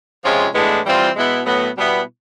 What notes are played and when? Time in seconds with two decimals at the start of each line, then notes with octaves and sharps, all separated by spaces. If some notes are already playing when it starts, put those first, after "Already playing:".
0.23 C3 F3 G#3 C#4 F4
0.54 A2 E3 G#3 B3 D4
0.86 E3 G3 C4 F4
1.16 B2 G#3 B3 E4
1.46 A2 F#3 B3
1.77 B2 G3 B3 E4